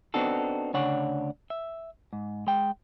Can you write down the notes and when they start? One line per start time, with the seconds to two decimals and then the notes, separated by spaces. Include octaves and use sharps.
0.14 B3 C4 D4 D#4 F#4 A4
0.73 D2 C#3 D4 C#5 F#5
1.50 E5
2.13 G#2
2.47 G#3 G5